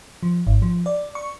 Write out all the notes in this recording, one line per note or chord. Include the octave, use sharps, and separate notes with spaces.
F3
G#1
F3
D5
C#6